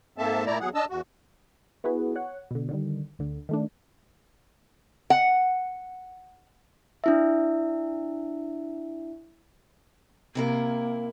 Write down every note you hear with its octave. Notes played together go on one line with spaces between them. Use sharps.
G#2 A#3 C4 A4 E5 A5
A#2 A3 E4 D5 A#5
E2 F#3 G#4 F#5
D4 D#5 A5 E6
E2 F#4
B3 E4 F#4 G#4 B4
C#5 F#5
B2 D3
D3 D#3 G3
D2 D3
D#3 A3 D4
F#5
D4 E4 E5
C3 A#3 E4 A#4